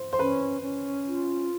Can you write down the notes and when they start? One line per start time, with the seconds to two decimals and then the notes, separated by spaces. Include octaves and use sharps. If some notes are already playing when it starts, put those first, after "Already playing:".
Already playing: C5
0.13 C5
0.19 C#4 B4
0.63 C#4
1.07 F4